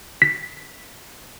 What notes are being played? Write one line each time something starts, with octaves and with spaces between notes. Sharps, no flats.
B6